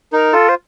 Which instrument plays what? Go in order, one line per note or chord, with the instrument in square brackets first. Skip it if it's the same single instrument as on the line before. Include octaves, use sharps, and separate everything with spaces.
[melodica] D#4 [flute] A#4
[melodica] F4 [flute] A4
[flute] C5